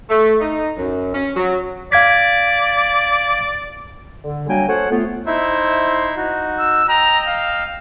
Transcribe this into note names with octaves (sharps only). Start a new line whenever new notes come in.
A3
D#4
F#2
C#4
F#3
D5 F5 G#6 B6
D3
F#3 G3 A#3 D4 G5 G#5
A4 C5 C#5 F#5
A3 B3 F4
D#4 E4 C5 E5
D#4 F#4
E6
D#5 G5 A#5 E6
F5